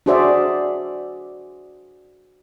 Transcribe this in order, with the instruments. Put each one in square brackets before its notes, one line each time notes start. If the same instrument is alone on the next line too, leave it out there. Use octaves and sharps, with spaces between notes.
[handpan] D4 F#4 G#4 C5 D5 E5